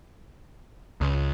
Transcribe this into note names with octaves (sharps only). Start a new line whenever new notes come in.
C#2